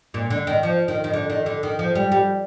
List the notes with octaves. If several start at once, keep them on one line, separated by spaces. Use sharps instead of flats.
A#2
D3
D#3
F3
D#3
D#3
D3
D#3
D3
D#3
F3
G3
G3